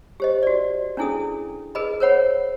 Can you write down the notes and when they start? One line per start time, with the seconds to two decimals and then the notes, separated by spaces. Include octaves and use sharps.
0.20 G4 C5 D#5
0.43 F#4 D5
0.97 C#4 D4 E4 G#4 A4 D#6
1.75 G#4 A#4 B4 D#5 B5
2.00 A#4 C5 C#5 F#5 B5